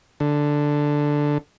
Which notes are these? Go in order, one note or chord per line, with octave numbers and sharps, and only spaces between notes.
D3